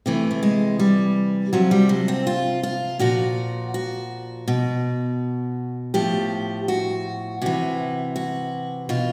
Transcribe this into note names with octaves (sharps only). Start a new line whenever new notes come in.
C3 E3 A3
A3
G#3
G3
C3 F3 F#3
G3
F#3
C4
F4
F4
A#2 F3 F#4
F#4
B2
A2 F3 G4
F#4
C3 E3 F#4
F#4
B2 F4